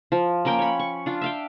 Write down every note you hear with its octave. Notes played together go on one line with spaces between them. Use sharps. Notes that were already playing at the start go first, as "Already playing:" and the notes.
F3
A#3 C#4 A#4 G5
C#5 B5
C#6
D4 F4
E5 F5 G5